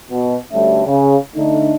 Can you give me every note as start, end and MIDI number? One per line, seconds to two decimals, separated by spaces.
0.11 0.36 47
0.52 0.84 38
0.52 0.84 43
0.52 0.84 55
0.52 0.84 57
0.52 0.84 61
0.52 0.84 76
0.86 1.16 49
1.36 1.74 50
1.36 1.74 57
1.36 1.74 62
1.36 1.74 63